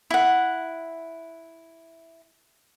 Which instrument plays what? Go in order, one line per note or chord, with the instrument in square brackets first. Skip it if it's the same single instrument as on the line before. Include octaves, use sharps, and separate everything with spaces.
[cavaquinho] E4 F#5